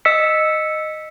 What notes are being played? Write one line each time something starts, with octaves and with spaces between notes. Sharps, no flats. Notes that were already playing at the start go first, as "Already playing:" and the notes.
D#5 E6 B6 C#7